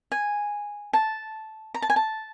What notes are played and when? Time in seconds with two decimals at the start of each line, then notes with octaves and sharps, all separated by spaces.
0.12 G#5
0.93 A5
1.74 A#5
1.82 A5
1.90 G#5
1.96 A5